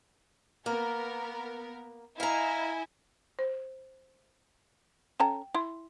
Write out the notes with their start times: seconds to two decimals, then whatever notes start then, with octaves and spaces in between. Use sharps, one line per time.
0.66 A#3 B3 A#4
2.20 E4 D#5 F5 G#5 A#5
3.39 C5
5.20 C#4 A4 G5 A#5
5.55 E4 C6